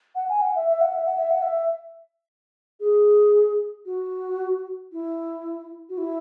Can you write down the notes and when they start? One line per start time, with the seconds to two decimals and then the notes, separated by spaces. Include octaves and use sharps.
0.15 F#5
0.29 G#5
0.42 F#5
0.56 E5
0.68 E5
0.81 F#5
0.93 E5
1.06 F#5
1.18 E5
1.30 F#5
1.42 E5
2.80 G#4
3.86 F#4
4.92 E4
5.89 F#4
5.98 E4